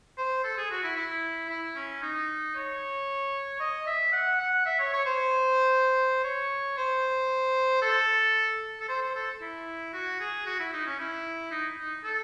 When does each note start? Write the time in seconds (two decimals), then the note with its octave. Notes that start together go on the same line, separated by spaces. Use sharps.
0.18 C5
0.44 A4
0.58 G#4
0.71 F#4
0.84 E4
0.97 E4
1.49 E4
1.76 C#4
2.02 D#4
2.55 C#5
3.60 D#5
3.87 E5
4.12 F#5
4.40 F#5
4.66 E5
4.79 C#5
4.93 C#5
5.06 C5
6.24 C#5
6.77 C5
7.82 A4
8.80 A4
8.88 C5
9.01 C5
9.15 A4
9.41 E4
9.93 F#4
10.20 G#4
10.46 F#4
10.59 E4
10.73 D#4
10.86 C#4
10.99 E4
11.51 D#4
11.79 D#4
12.04 A4